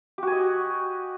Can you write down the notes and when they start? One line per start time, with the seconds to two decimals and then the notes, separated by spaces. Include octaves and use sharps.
0.18 G4
0.23 F#4
0.27 G#5
0.32 D#5